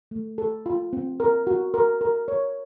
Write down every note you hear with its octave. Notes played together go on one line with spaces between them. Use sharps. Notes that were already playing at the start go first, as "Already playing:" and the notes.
A3
A4
F4
C4
A#4
F#4
A#4
A#4
C#5